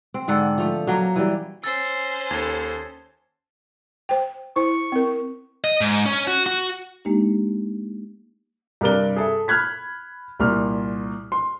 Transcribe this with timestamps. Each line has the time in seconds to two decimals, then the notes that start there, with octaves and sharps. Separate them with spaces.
0.14 C4
0.28 G#2 D3 A4 F#5
0.58 F3 A3
0.87 F#3 A#3 C#4
1.16 E3 G3
1.64 C#4 C5 E6 A6
2.31 D#2 A4 A5 G#6
4.09 C5 G5
4.56 E4 C5 C#6
4.92 C4 A#4
5.64 D#5
5.81 G#2
6.06 C#4
6.27 F#4
6.46 F#4
7.05 G#3 A#3 D4 D#4 G4
8.81 G2 C3 A#4 D5 G7
9.16 G#4 A4 E5
9.48 B5 F6 F#6 G#6 B6
10.39 C2 A#2 F6
11.32 C6